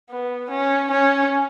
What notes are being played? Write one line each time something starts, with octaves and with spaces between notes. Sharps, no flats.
B3
C#4
C#4